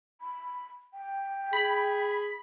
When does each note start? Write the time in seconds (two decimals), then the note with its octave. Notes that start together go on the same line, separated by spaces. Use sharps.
0.21 B5
0.94 G5
1.53 G#4 B5